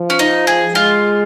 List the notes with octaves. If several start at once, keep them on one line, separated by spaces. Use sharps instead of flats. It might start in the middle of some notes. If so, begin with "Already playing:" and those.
Already playing: F3
C#4
D#4
G#4
G#3 F4